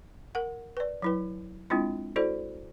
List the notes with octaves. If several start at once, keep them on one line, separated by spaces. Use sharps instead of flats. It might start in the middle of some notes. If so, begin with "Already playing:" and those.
A#4 F#5
B4 D5
F#3 E4 B4
G#3 C4 D4 E4 F4
E4 F#4 A4 C5 D5